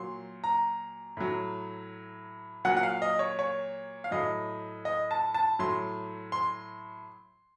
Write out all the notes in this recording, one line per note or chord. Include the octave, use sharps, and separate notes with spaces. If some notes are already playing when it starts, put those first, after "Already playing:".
Already playing: A#2 F#3 C6
A#5
A2 F#3
A#2 F#3 F#5
F#5
F5
D#5
C#5
C#5
F5
A2 F#3 D#5
D#5
A5
A5
A2 F#3 C6
C6